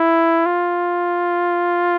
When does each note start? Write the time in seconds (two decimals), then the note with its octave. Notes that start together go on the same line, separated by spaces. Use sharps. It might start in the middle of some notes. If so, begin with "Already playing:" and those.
Already playing: E4
0.46 F4